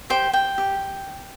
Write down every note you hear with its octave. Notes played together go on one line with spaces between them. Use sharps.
G4 C5 G5
G5
G4